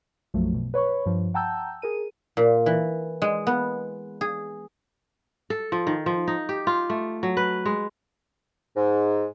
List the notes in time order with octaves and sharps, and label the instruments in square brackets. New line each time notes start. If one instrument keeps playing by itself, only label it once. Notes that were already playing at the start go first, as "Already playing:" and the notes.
[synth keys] B1 F#2 F3 F#3 A3
B2
B4 C#5 B5 C#6
G2 F3
F#5 G5 A5 A#5 E6 G6
G#4 A#4 D#7
[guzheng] A#2
E3
G#3
B3
G#4
[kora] A4
F3
D#3
F3
D#4
G4
F4
A3
F#3
B4
G#3
[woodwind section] G#2